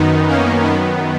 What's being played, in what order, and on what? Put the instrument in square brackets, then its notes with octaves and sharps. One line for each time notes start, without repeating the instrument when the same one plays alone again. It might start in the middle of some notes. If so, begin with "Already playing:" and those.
Already playing: [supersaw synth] F#2 D#3 B3 D#4
A#3 C#4
F#2 D#3 B3